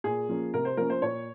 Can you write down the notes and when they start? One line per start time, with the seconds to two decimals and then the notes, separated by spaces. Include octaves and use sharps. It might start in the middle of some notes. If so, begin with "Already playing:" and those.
0.04 A#2 G#4
0.29 F3 A#3 C#4
0.53 C3 A#4
0.65 C5
0.77 F3 A#3 C#4 A#4
0.90 C5
1.02 A#2 C#5